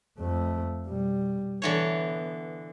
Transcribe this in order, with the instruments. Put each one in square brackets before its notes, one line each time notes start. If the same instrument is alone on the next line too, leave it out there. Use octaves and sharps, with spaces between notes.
[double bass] F2 A3
B2 G3
[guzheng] D3 E3 C#5 [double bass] B3